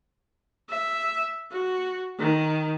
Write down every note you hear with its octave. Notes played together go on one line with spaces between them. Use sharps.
E5
F#4
D#3